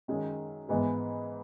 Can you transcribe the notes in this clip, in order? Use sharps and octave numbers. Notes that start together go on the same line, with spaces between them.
F#2 D#3 G#3
G#2 E3 G#3 B3